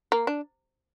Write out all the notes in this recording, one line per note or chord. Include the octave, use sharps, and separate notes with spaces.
A#3
D4